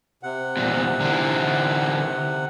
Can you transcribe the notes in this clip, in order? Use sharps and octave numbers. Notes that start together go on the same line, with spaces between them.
C3 F#5
E2 A#2
D3 E3